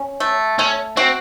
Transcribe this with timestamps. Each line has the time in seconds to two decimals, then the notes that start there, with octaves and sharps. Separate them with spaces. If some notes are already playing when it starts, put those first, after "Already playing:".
Already playing: C#4
0.20 A3
0.58 A3 C#4
0.96 C4 F#4